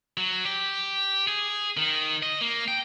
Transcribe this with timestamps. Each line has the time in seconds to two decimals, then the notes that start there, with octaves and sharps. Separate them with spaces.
0.17 F#3
0.45 G4
1.27 G#4
1.77 D#3
2.23 D#5
2.41 A#3
2.68 G5